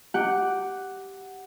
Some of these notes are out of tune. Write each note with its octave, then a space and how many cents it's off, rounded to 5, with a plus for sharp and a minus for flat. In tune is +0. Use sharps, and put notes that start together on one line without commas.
G4 -5 F#5 +5